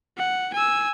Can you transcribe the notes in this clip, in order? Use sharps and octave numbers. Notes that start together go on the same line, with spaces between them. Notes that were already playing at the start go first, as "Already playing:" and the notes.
F#5
G#5 E6